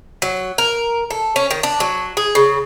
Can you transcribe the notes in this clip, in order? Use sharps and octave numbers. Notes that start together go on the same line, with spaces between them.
F#3
A#4
A4
C#4
D#3
D4
F#3
G#4
C#3